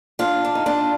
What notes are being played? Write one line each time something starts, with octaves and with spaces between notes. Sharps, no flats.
D4 F4
D4
D#4
D4 F4